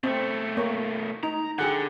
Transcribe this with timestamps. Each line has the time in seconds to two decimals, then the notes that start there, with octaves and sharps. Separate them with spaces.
0.04 B2 A3 C4
0.57 A#3 C#5
1.23 D#4 A#5
1.59 D3 G4 G#4 F#5